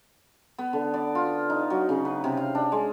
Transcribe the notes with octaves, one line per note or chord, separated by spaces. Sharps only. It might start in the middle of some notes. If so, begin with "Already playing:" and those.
B3
D3
D5
F4
D#4
F#3
C#3
B4
C3
F5
D4
G#3